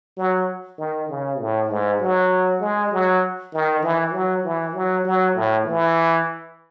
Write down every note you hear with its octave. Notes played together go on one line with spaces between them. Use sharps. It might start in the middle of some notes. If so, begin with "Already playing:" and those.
F#3
D#3
C#3
A2
G#2
F#3
G#3
F#3
D#3
E3
F#3
E3
F#3
F#3
A2
E3